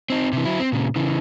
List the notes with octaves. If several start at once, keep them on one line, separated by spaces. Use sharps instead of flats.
C4 D#4
C3 E3
F#3 E4
C4
A#2 C#3
C#3 E3